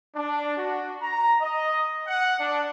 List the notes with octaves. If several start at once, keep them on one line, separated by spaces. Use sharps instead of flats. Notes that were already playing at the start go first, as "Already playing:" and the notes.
D4
F#4
A#5
D#5
F#5
D4